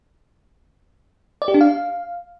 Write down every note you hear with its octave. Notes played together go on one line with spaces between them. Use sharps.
D5
G4
D4
F5